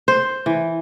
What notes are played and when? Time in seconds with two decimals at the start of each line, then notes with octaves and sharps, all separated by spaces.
0.08 C5
0.46 E3